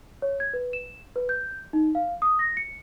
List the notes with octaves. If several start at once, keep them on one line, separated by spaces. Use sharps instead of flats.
C#5
G#6
B4
E7
B4
G6
D#4
F5
D#6
A#6
C#7